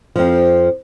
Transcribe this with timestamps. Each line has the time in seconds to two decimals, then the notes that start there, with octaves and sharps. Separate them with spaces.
0.16 F2 F3